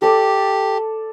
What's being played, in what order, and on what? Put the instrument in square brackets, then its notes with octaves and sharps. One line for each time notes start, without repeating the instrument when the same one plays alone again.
[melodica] G4 [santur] A4 D5